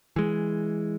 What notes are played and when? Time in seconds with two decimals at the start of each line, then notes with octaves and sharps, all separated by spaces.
0.16 E3 G#3